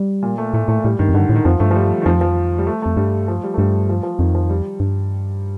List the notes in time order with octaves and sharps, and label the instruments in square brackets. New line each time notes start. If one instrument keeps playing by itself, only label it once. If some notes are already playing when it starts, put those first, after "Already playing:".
Already playing: [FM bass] G3
[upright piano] A#2
A3
[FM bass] A2 [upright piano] A3
[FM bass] A2 [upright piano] A3
[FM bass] A2 [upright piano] G3
[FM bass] G2 [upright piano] D#3
[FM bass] F2
[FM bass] G2 [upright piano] D3
[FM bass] A2
[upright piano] D#3
[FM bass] F2 [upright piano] F3
[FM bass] G2 [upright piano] A3
[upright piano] F3
G3
D#3
[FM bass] F2 [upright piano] F3
[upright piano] F3
G3
A3
[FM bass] F2 [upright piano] A3
[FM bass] G2 [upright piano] G3
[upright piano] F3
G3
A3
[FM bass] G2 [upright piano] G3
[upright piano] F3
F3
[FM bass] F2 [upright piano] D#3
[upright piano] F3
G3
[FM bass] G2